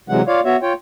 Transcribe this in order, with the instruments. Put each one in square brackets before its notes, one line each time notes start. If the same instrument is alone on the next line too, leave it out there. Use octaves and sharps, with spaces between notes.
[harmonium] C3 E3 F#3 G#3 F#5
F4 C#5 D5 F5
B3 F#4 C#5 E5
F4 C#5 G5